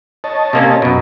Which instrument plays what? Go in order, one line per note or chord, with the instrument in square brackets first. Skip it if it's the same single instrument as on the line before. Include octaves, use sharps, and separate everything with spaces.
[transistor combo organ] C#5 D#5 A5
[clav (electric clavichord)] C3 A#3 C#4
F#2 B2